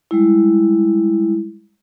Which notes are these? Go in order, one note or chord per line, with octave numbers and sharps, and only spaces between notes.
G3 G#3 E4